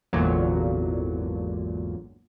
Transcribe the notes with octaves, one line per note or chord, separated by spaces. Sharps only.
G#1 E2 A#2 D3 F#3